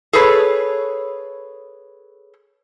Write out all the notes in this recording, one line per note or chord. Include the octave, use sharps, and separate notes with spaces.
G#4 A4 B4 C#5